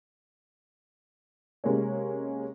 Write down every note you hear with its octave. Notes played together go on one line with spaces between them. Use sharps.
C3 G#3 A#3 C#4